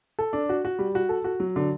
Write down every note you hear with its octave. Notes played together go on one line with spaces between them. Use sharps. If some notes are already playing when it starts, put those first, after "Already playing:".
A4
D4
F#4
F#4
G3
F#4
A4
F#4
F#3
D3